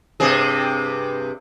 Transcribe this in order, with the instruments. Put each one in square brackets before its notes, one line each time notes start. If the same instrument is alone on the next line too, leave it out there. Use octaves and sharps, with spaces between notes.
[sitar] G2 C3 G#4